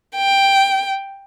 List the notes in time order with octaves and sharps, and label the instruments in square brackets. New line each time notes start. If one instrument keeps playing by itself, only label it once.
[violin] G5